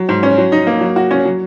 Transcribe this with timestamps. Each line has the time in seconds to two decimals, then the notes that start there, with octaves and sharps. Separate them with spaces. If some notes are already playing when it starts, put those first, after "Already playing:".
Already playing: F#3
0.09 G#2
0.23 C#4
0.38 F#3
0.52 D#4
0.67 A#3
0.81 F#3
0.96 F#4
1.11 C#4
1.25 F#3